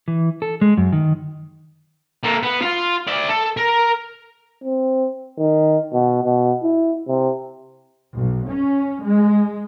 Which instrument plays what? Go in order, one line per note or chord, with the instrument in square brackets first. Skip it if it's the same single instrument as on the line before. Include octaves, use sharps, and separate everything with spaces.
[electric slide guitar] E3
A4
G#3
F#2
D#3
[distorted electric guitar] A#3 A4
B3
F4
D5 E5
A4
A#4
[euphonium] C4
D#3
B2
B2
E4
C3
[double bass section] B1
C#4
G#3